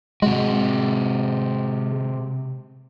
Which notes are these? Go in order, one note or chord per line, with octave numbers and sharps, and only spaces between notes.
C3 G#3 F#4